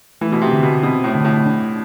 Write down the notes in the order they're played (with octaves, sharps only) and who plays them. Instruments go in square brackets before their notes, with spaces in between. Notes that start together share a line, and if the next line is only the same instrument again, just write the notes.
[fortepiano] E3 [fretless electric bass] A3
[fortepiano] B2
C3
[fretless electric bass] D3
[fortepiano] B2
[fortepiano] B2 [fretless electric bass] C4
[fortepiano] A2
[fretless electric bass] D3
[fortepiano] A2
[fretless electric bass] D4